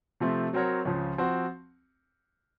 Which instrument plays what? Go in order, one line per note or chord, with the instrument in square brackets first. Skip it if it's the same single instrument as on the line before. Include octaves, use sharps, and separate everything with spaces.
[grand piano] C3 F3 A3 C4
F#3 C4 F#4 A#4 C#5
C#2 C#3 F3
F3 C4 F#4